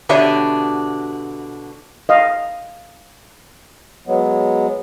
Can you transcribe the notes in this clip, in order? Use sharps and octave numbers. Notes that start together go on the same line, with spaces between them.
B2 D3 D4 G4 C#5 E5
D#5 F5
F#3 G#3 B3